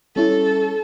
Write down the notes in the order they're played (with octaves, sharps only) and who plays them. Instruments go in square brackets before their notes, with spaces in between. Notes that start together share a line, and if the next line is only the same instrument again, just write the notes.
[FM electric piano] G3 C#4 E4 [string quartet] A4